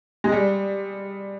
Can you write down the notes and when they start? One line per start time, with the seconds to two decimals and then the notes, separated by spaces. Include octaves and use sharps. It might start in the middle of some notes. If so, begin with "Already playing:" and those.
0.24 G#3
0.32 G3